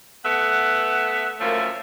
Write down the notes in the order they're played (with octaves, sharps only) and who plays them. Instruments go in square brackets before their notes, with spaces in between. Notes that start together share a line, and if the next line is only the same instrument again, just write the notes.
[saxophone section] A3 B3 E5 F#5
F#2 A2 F3 A3 A#3